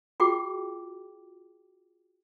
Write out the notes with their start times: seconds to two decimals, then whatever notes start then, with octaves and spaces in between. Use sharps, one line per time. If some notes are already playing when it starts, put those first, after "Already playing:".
0.20 F4 F#4 G#4 G5 D6